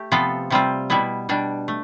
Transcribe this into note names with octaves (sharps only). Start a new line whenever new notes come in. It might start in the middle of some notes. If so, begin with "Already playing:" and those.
Already playing: A3 G4
C3 F3 B3 F4 A4
C3 G3 C4 F4
B2 G3 B3 E4
B2 G3 D4
A3